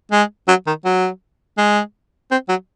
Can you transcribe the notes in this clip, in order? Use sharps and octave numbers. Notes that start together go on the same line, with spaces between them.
G#3
F#3
D#3
F#3
G#3
C4
F#3